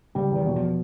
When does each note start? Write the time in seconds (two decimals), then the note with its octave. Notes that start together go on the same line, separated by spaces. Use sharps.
0.15 C#3 G3
0.31 E2 D#3
0.46 B2
0.56 F3